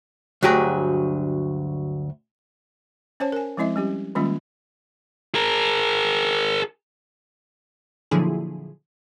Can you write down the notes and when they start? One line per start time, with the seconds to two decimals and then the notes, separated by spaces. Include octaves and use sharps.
0.43 D2 G2 F#3 G4 G#4 A#5
3.20 C#4 C5 C#5 A5
3.32 A#4 G#5
3.57 F3 G#3 C4 E4 D#5 E5
3.76 G3 C#4 G4
4.15 D#3 G3 G#3 A#3 C#4 F4
5.35 G#4 A#4
8.11 A#2 D3 F3 F#3 E4 G#4